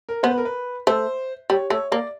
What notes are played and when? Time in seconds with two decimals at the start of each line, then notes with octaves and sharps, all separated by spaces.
0.09 A#4
0.23 B3 C5
0.31 B4
0.38 A#4
0.45 B4
0.87 A3 C5
1.50 G3 C#5
1.70 A3 C#5
1.92 A#3 D5